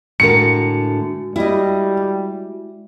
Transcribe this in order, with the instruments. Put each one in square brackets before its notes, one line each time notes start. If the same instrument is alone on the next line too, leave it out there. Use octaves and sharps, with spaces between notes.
[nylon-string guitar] A2 D3 A#4 [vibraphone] G#3 F#4 [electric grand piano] C#7
[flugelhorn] G3 [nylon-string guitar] E4 D#5